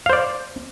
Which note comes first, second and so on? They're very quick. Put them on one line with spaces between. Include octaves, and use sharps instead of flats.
F5 C5 D5